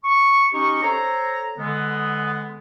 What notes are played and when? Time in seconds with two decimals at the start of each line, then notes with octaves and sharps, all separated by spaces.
0.05 C#6
0.53 C#4 D#4 G4 D#5 C#6
0.83 A4 C5 C#5 A#5
1.59 D3 G#3 B3